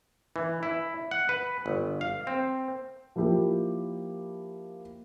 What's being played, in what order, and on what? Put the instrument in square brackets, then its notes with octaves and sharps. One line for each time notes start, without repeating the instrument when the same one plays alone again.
[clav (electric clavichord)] E3
E4
F#5
B4
G1
F5
C4
[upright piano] F3 A#3 E4 G4